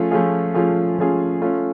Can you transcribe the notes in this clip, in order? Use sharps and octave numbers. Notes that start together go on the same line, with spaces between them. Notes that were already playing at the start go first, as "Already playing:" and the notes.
Already playing: F3 A3 C#4 F4 G#4
F3 A3 C#4 F4 G#4
F3 A3 C#4 F4 G#4
F3 A3 C#4 F4 G#4
A3 C#4 F4